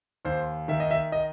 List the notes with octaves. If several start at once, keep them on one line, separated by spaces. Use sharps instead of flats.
D#2 C5
D#3 E5
D#5
E5
D#5